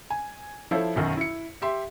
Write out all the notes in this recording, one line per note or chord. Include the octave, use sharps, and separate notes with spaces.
G#5
F3 E4 F4 A4 C5 C#5
B1 F#2 D#3 F#4
E4 C#7
G4 E5 C6